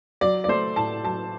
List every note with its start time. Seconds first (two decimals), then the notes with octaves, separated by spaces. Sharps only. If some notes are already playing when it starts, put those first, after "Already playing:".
0.21 F#3 D5
0.44 D5
0.48 A3 C5
0.76 A2 A5
1.04 F#3 A5